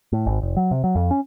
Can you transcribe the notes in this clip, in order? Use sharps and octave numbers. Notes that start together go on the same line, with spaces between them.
A2
G#1
F1
F#3
C3
F#3
F2
C#4